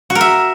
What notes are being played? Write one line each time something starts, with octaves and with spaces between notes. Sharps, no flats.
F#4
A#4
E5